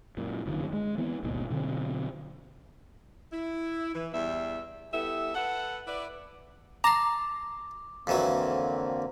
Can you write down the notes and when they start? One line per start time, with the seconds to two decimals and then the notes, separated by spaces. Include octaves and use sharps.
0.17 F#2 A#2
0.46 F#1 G2 C3 D#3
0.73 G#3
0.98 E3 B3 C4
1.23 D1 G#1 D#2 B2
1.50 B2 D3 F#3 C4
3.32 E4
3.94 E3
4.14 E2 G3 E5
4.93 G3 B3 E4 A4 E5
5.34 A4 B4 F#5
5.87 E4 B4 D5
6.84 A5 A#5 C6 D6
8.07 F2 D3 E3 F#3 A#3 C4